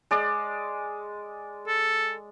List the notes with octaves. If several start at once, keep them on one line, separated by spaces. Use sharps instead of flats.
G#3 D5
A4